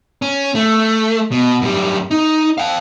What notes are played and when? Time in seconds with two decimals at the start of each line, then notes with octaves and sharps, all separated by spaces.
0.22 C#4
0.55 A3
1.32 B2
1.61 F#2 G3
2.11 D#4
2.58 F5 G5